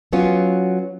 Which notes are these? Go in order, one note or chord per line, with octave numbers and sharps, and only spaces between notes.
F#3 B3 C#4 F4